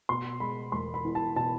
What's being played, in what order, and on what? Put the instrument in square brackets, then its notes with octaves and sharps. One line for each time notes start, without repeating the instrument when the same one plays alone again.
[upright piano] B2 C6
G#3 B5
E1 C6
B5
E2
A5
B2 A5